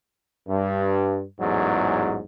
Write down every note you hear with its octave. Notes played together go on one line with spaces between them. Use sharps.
G2
A1 E2 G#2 F#3